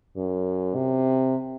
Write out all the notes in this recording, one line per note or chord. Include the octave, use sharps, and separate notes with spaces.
F#2
C3